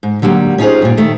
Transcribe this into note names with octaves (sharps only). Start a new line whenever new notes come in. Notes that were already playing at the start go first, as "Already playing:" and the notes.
G#2
D3 F#3 G3 A3 A#3
C#4 D#4 F4 F#4 G#4 C5
G2 A#2
D#3 A3